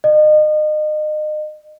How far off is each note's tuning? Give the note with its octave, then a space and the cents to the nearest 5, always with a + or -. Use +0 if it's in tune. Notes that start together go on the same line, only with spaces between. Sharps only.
D#5 -30